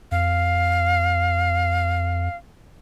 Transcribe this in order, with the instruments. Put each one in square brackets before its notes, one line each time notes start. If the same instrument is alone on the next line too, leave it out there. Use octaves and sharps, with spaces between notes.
[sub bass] F2 [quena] F5